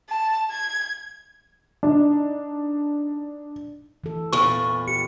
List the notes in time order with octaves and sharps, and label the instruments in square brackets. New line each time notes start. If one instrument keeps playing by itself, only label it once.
[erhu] A5
G#6
[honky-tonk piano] D4 D#4
[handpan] E3 A4
[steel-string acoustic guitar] E2 A#2 [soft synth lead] C#6
[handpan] G4 [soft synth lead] C#7